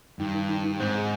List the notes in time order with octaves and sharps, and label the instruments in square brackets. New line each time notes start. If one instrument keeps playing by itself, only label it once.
[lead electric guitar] G2 [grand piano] D#3
[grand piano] D#3
D#3
D#3
[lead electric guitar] G#2 [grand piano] C4
[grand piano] G#3